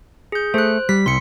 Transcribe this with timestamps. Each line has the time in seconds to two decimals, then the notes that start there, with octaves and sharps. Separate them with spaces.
0.32 G#4 G6
0.54 A3 C5 F#6
0.89 G3 B6
1.06 C2 C6 C#7